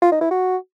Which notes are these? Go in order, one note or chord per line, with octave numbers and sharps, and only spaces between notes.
F4
D#4
E4
F#4